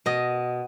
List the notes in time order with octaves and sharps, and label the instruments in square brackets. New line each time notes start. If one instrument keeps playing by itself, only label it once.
[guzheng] B2 D#5